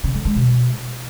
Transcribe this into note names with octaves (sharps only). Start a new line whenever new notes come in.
C#3
D3
G#3
B2